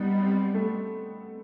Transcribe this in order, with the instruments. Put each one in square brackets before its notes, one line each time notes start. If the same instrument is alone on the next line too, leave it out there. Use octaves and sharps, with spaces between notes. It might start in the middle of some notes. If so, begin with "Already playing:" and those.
Already playing: [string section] G3 [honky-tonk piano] B3 D#4
[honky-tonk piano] C4
A3